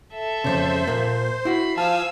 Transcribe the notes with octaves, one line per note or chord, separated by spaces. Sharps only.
A4 E5
F2 A#2 C#3 C5
A#2 A#3
E4 F#4 B5 C7
F3 F5 G#5 A5 E6